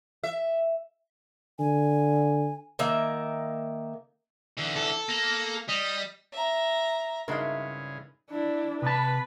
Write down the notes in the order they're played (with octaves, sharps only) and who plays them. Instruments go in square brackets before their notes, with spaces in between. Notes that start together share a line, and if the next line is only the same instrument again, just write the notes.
[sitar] E5
[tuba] D3 [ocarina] G#5
[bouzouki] D#3 A#3 E5
[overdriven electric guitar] D3 E3
[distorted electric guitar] A4
[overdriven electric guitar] A#3
[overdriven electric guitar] G3 [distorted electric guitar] D#5
[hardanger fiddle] E5 A#5
[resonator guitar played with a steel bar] G2 G#3 [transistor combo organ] C#3 [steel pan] D#4 A#4 [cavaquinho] E4 F#4 E5
[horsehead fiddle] D4 E4
[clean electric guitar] C3 A5 [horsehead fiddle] B4 B5